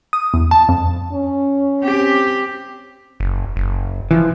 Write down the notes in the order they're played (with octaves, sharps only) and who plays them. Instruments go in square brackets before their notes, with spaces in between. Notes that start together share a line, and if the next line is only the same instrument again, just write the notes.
[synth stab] D#6
E2
A5
F2
[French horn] C#4
[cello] C4 G4
[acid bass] F#1
F#1
[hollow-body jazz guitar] E3 [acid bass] F3